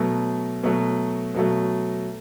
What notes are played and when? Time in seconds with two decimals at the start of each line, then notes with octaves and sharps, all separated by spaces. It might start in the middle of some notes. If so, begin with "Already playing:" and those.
Already playing: B2 F#3 A3
0.63 B2 F#3 A3
1.34 B2 F#3 A3